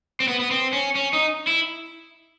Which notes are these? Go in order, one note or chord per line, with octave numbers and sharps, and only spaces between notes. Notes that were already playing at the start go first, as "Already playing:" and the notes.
C4
B3
B3
C4
C#4
C#4
D#4
E4